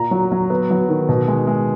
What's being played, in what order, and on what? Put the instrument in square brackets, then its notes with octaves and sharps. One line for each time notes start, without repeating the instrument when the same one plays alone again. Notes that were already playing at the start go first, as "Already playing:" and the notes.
Already playing: [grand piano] A#2 A#5
F#3
F#3
B3
F#3
D#3
B2
G#3
G#3